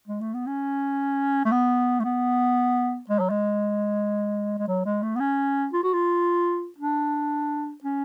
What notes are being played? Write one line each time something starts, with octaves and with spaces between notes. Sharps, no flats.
G#3
A3
B3
C#4
A3
B3
A3
B3
G#3
F#3
G#3
G#3
F#3
G#3
A3
B3
C#4
F4
F#4
F4
D4
C#4